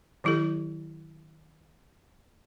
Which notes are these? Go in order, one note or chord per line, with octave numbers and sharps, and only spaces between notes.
D#3 F#3 E4 G4 A4